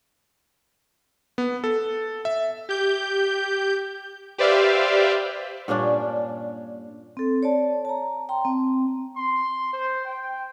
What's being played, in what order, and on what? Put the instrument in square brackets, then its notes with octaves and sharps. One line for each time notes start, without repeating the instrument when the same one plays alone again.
[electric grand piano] B3
A4
E5
[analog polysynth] G4 G6
G4 B4 C5 D5 E5 F5
[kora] G2 A#2 C#4 D4
[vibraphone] C4 A4
C#5 D5 A5
A5 A#5
G5 A#5 C6
C4
[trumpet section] C6
C5
G5